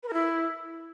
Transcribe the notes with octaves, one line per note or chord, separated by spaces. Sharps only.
B4
A#4
E4